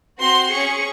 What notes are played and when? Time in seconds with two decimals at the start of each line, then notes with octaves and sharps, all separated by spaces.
0.19 C4 F#4 C6
0.50 C#4 G#4 C#6